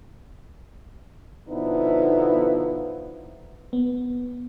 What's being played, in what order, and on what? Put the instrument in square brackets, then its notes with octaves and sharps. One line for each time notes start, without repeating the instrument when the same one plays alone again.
[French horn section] B2 D3 F3 B3 D#4 E4
[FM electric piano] B3